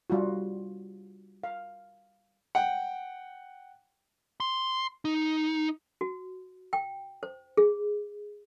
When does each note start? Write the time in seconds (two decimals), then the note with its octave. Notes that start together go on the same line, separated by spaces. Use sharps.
0.10 G3 F4 F#4
1.44 F5
2.55 F#5 G5
4.40 C6
5.05 D#4
6.01 F#4
6.73 G5
7.23 C5
7.57 G#4